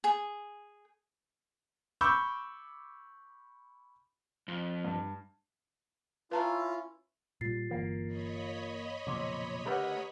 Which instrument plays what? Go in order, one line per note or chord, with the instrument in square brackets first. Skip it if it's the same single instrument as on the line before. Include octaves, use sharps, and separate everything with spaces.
[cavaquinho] G#4
[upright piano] B5 C#6 D6 E6 G6
[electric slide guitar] F2
[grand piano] G2
[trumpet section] C#4 E4 [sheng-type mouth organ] F4 [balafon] B4 A5 A#5
[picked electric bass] A#2 G3 [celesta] F4 A6 C7
[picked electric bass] G1 E3 [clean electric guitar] A#3
[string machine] C#5 D#5 B5
[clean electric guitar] B1 F2 A#2 [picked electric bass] C#3 [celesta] D6
[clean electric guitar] D3 A3 A#4 [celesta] G4 B4 F#5